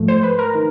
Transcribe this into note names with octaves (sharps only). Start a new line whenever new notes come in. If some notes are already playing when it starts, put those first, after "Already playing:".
Already playing: G#2 F3 A3
C5
B4
A#4
D#3